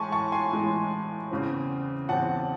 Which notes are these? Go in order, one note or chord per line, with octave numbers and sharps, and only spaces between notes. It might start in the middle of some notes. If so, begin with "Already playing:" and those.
Already playing: A2 E3 G#3 G#5 A5 C6 C#6
A5 C#6
G#5 C6
A2 E3 G#3
E2 C#3 E3 C4
E2 C#3 E3 C4 F#5 A5